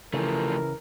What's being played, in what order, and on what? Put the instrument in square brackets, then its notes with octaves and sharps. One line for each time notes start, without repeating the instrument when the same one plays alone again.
[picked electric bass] C#3 [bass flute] E3 [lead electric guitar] F3 A3 [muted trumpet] A#4